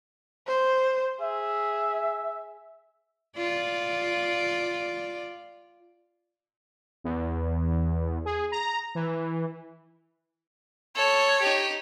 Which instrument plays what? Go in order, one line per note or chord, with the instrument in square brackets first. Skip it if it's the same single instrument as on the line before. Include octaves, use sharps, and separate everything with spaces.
[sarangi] C5
[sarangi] G#4 [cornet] E5
[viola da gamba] F4 D5
[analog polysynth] E2
G#4
A#5
E3
[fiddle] A4 [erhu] C#5
[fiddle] D#4 G4